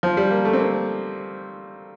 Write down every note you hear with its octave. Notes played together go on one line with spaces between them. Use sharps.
F3
G3
A#3
A3
C4
A#3